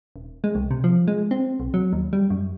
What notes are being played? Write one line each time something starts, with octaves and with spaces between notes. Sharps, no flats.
D#1
G#3
C2
C3
F3
G#3
C4
B1
F#3
D#2
G3
F#2